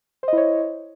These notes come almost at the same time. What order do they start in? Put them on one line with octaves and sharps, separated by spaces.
C5 D#5 E4 C#5